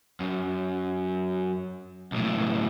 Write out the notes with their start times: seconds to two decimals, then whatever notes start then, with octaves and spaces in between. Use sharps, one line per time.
0.20 F#2
2.12 B1 A2